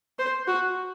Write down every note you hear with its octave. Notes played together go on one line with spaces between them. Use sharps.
C5
F#4